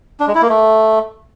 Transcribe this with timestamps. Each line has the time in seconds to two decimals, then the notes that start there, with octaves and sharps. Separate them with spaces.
0.20 D4
0.27 G#3
0.35 E4
0.42 A#3
0.50 A3